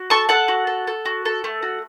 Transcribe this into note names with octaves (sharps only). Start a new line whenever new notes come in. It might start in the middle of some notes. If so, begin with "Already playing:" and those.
Already playing: F#4
A4 A5 C#6
A4 F#5 A5
F#4
A4
A4
F#4
A4
A3
F#4